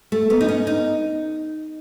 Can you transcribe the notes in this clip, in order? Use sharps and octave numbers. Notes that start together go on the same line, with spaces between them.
A3
B3
D#4
C#4
D#4